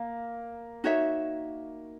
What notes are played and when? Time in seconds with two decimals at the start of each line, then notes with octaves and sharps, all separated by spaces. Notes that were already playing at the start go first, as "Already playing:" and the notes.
Already playing: A#3
0.84 D#4 F#4 C#5 E5